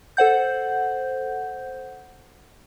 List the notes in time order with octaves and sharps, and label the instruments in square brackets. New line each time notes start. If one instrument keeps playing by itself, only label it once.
[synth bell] A4 C5 F#5 G6